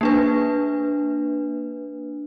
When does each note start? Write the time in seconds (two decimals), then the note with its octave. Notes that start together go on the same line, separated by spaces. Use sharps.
0.01 A#3 D4 B4